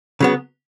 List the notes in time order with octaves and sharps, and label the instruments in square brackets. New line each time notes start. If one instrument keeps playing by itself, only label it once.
[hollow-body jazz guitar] C#3 F#3 B3